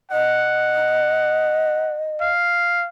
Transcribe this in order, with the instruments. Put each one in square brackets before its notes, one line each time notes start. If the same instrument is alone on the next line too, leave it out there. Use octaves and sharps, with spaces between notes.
[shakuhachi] D#5 [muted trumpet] F#5
[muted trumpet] F5